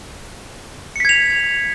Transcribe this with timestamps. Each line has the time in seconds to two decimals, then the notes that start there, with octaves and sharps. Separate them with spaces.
0.96 C#7
1.00 B6
1.05 G#6
1.09 F7